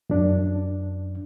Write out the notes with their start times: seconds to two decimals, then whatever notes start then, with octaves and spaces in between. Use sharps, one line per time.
0.10 F#2 D4